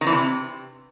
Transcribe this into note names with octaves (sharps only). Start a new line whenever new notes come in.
D#3
E3
C3